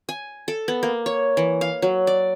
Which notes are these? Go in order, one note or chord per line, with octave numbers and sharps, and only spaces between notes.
G#5
A4
B3
A#3
C#5
E3
F5
F#3
D5